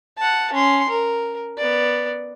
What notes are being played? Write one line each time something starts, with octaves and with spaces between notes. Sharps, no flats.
F#5 A5
C#4 C6
A#4
B3 D5